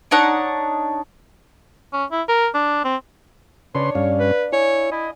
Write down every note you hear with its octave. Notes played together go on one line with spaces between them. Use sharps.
D4 D#4 C#5 F#5
C#4
E4
A#4
D4
C4
C#3 D4 B4 C#5 D5 C6
G2 C#4 F5
B4
E4 C#5 G#5
E4 D#5